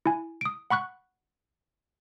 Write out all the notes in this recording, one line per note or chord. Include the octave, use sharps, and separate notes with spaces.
E4 G#5
D#6 D7
F#5 B5 C#6 F#6